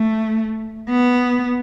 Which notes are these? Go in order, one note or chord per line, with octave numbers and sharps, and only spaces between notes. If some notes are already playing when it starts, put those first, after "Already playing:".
Already playing: A3
B3